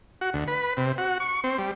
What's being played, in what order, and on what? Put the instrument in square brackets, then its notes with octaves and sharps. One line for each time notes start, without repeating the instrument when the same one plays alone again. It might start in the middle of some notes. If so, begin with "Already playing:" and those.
[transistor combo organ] F#4
D2
B4
C3
F#4
C#6
C4
G3